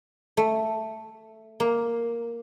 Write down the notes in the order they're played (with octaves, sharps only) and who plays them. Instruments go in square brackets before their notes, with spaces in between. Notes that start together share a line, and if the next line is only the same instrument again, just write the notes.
[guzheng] A3
A#3